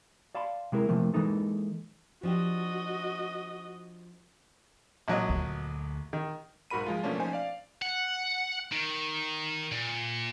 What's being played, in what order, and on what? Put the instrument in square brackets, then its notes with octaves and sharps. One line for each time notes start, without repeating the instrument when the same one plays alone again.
[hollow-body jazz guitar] D5 F5 A5 B5 C6
C3 G#3 E4 A#4
C3 E3 F3 A3 A#3
E3 F3 G#3 A#3 D#4 A4
[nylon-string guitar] F3 D4 G4 [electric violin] F#4 D#5
[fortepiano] A#1 F#3 D#5
[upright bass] D2
[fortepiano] D#3
[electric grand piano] B1 G#2 F#4 A#4 B5 D#7
F3 G#3 F4
B2 F3 A3 A#3 C#4 D4
F3 C#4 D#4 C5 G#5
D5 F5
[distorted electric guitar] F#5
D#3
A#2